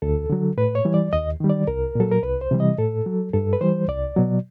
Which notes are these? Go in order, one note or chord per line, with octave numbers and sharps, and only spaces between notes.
D2 A4
D3 F#3
A2 B4
C#5
E3 G3
D5
D#2 D#5
D#3 G3
D5
C2 A#4
A#2 F#3 A4
A#4
C2 B4
C5
C3 E3 G3
D#5
A2 A4
F#3
G2 A4
B4
E3 G3 C5
C2 D5
B2 F#3